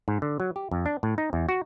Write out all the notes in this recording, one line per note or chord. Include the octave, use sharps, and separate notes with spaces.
G#2
D3
F#3
G4
F2
D4
A2
D#4
E2
F#4